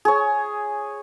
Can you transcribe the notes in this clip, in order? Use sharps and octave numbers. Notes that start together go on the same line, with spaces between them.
G#4 C#5